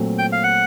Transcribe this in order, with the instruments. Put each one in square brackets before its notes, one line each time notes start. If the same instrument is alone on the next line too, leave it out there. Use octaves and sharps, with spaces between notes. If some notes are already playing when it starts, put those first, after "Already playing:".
Already playing: [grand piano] A#2 F#3 A3 C4
[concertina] G5
F5
F#5